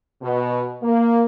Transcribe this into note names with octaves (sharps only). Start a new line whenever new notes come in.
B2
A#3